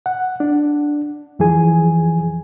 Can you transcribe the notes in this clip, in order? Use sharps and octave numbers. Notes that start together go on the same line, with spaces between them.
F#5
D4
F2 E3 F3 G#4 G#5